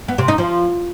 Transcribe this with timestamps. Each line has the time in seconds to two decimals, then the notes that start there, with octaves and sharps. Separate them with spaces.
0.08 B3
0.18 C3
0.28 D#4
0.38 F3